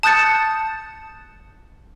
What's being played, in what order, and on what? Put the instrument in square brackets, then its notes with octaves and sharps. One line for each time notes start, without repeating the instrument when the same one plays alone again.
[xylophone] A5 D#6 F#6 G6 A6 C#7